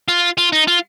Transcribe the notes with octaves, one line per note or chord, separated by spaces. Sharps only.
F4
F4
D#4
F4